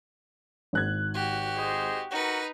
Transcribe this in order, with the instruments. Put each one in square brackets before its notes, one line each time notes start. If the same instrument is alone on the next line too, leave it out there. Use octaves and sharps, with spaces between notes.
[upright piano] G#1 F#6 G#6
[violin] F#4 G4
[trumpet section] G#4 C5 D#5
[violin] D#4 B4 [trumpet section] F#4 A#4 F#5